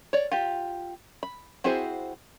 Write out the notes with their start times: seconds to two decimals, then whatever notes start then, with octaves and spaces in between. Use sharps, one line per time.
0.13 C#5 D5
0.32 F4 G4
1.23 B5
1.64 C4 E4 F#4 G#4 C5